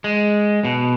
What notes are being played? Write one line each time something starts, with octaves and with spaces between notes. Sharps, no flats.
G#3
B2